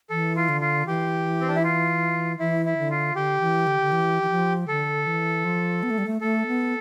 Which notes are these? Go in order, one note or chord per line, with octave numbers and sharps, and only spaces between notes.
E3 A4
F4
D3
F4
E3 G4
C4
D4
E4
F4
E3 E4
E4
D3
F4
D3 G4
E3
D3
D3
E3
E3
F3
D3 A4
E3
F3
B3
A3
G3
A3
A3 A4
B3